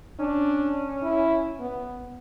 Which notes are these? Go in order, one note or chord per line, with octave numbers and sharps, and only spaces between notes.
C#4 D4
E4
B3